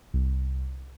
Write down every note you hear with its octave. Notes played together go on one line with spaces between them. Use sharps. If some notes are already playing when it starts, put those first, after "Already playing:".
C2